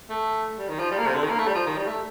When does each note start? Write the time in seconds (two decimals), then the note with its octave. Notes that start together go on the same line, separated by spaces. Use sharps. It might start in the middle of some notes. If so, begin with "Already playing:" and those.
0.10 A3
0.58 G3
0.69 D#3
0.79 F3
0.91 G3
0.98 A#3
1.07 C3
1.15 D3
1.23 D#3
1.30 A#3
1.39 A3
1.47 G3
1.55 F3
1.66 D#3
1.77 G3
1.87 A3